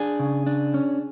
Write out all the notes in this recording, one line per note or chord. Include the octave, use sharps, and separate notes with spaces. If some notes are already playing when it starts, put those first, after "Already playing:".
Already playing: D4 G#4
C#3
D4
C#4